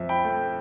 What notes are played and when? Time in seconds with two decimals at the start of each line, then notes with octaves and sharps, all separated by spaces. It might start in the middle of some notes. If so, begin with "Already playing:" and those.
Already playing: F2 F3 E5
0.09 G5 B5
0.25 A3